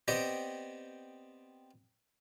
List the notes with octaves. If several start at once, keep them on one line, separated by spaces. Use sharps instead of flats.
B3 C4 G4 D5 D#5